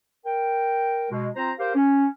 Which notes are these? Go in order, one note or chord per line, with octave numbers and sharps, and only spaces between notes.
A#4 G5
B2 G#3
C4 F4 C5 A#5
G4 A#4 C5 F5
C#4